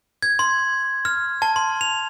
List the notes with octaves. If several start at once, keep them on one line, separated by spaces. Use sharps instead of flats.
G#6
C6
F6
A5
C6
F7